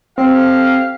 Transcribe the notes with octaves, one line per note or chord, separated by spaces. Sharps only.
C4 G4 A4 F5